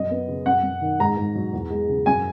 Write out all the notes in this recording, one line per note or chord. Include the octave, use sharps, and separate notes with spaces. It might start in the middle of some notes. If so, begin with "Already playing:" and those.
Already playing: F#2 D#5
B3
C#3
F#2 F#5
F#2
D#3
G#2 A#5
G#2
F#3
E2
G#3
C#3
F#2 G#5